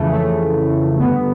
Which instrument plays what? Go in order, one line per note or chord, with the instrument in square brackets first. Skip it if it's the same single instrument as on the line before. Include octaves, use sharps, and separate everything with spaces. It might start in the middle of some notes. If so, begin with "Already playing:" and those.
Already playing: [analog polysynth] F2 C#3 E3 A3
A3
G2 D3 B3